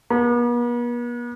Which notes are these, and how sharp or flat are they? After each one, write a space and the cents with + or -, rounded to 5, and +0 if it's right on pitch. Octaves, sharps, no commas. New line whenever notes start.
B3 -45